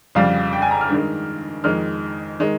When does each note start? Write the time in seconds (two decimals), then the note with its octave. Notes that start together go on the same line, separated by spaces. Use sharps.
0.15 F2 C#3 G3 F5
0.53 G5
0.62 G#5
0.71 A#5
0.81 F6
0.89 G2 D#3 G#3
1.64 F2 D#3 G#3 F6
2.40 D#3 G#3